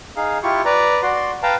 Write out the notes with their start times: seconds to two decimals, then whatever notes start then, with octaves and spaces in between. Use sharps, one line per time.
0.16 D#4 G#4 F5
0.43 E4 F4 G4 C#6
0.65 B4 D5 A#5
1.02 F#4 D5 C6
1.43 B4 F5 G5 A5 A#5